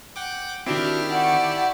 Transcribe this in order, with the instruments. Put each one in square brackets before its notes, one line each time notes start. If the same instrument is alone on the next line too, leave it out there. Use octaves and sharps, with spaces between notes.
[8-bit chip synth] F#5 G5 D6
[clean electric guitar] D#3 C4 [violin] D4 F6 [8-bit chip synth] E4 G4 A5 [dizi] F#4
[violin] D5 C#6 [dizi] F#5